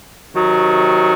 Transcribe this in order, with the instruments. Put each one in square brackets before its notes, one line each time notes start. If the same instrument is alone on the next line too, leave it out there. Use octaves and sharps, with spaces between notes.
[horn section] C3 D#3 F#3